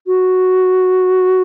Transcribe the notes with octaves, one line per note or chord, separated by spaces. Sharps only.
F#4